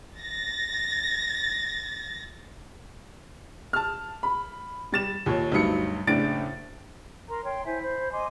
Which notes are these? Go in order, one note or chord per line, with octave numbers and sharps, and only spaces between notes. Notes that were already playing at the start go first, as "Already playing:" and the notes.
A6 A#6
A5 F6
B5
G3 A6 E7
D#2 A#2 C#5
D2 G2 F#3 D#4 C#7
F#1 A2 D4 A6 D7
A#4 A#5 C6
C#5 G5 C6
E4 C5 E5 G#5
C5 B5
D#5 G#5 C6 D6